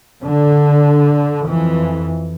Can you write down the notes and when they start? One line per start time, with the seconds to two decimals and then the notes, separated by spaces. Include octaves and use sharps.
0.24 D3
1.47 F2 E3